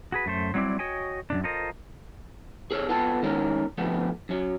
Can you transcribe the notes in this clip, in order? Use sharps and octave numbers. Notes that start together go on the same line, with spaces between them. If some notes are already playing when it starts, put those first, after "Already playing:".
F#4 G#4 B4
F#2 A3 C5
F#3 G3 C4 E4 D5
F#4 C#5 D#5 G5 G#5
F#2 C3 D4
F4 A4 A#4 C5 D#5
G#4 A4 C#5
B3 F4 A4 A5
D#3 G#3 C#4 A#4
D3 F3 A3 B3
F#2 F#3